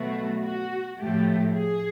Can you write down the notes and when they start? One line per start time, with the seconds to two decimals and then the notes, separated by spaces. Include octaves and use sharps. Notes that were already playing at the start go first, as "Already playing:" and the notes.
Already playing: B2 F#3 A3 F#4
0.44 F#4
0.99 A2 F3 A3 G4
1.55 G#4